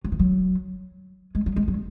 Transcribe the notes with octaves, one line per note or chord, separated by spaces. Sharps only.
F#3
E3
F#3
G#3
F#3
G#3
F#3